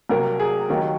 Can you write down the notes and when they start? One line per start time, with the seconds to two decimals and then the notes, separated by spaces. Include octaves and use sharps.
0.09 C2 C3 F#3 A#3 A#4
0.40 G#4
0.69 D#2 D#3 F#3 A#3